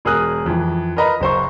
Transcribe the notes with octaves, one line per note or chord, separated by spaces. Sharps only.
E1 G#4 A#4 A#5 D#6 F#6
F2 E3
A#4 B4 D#5 A#5 B5
F#1 C5 C#6